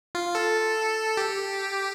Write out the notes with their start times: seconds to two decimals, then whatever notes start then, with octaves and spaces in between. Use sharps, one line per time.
0.15 F4
0.35 A4
1.17 G4